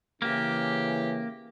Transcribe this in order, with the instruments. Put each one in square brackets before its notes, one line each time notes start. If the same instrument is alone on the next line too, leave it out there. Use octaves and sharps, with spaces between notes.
[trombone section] C#3 E3 [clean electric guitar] A#3 [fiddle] G4